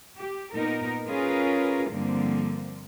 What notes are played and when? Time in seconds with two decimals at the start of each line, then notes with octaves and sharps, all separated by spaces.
0.17 G4
0.55 A#2 B3 D#4 A#4
1.06 C#4 F4 G#4 A#4 B4
1.89 G2 D3 F3 A#3 C4